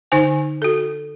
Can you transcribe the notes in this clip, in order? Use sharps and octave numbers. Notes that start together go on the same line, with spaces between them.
D3 D#4 C5 G#5
F#4 A4